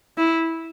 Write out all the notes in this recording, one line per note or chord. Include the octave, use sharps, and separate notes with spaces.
E4